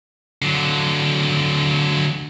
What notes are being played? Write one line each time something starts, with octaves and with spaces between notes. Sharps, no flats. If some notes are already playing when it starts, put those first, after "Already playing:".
D3 F#3